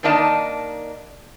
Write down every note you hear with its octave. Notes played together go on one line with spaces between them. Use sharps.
D#3 A#3 D4 D#4 D#5 A5